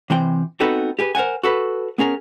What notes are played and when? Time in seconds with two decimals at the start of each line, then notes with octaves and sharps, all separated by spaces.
0.10 C3 E3 C4 G5
0.60 B3 C4 D#4 F#4 A4 B4
0.99 G4 G#4 B4
1.15 A#4 C5 D#5 F#5 G#5
1.43 F#4 A4 B4
1.98 B3 C#4 G#4 A#4